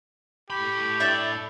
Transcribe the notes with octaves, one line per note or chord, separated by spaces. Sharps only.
A2 G4 B5
D4 E5 G6